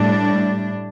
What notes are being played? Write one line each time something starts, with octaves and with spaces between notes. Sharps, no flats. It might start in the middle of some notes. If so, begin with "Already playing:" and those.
Already playing: A2 G3 D4